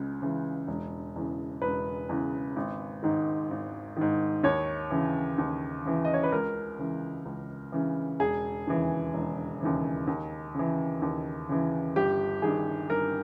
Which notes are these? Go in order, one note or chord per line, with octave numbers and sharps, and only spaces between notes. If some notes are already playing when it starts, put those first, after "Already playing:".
Already playing: C#2 C#3
C#3 E3
E1
E2 C#3
E1 B4
E2 C#3
G#1
G#2 D#3
G#1
G#2 D#3
D#2 C#5
C#3 E3
D#2
C#3 E3
D#5
C#5
B4
C#2 A#4
C#3 E3
C#2
C#3 E3
E1 G#4
D#2 C#3 E3
E1
D#2 C#3 E3
D#2
C#3 E3
D#2
C#3 E3
G1 G4
G2 D#3 G#4
G1 A#4